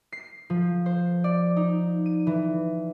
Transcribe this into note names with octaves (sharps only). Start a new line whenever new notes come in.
C7
F3
C5
D5
D#4
D#7
E3